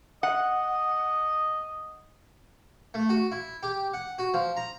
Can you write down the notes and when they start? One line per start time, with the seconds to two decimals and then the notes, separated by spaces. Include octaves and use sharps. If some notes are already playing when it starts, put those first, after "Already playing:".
0.23 D#5 F#5
2.94 A3
3.09 F#4
3.32 E4
3.63 G4
3.93 F#5
4.18 F#4
4.34 F3
4.57 A#5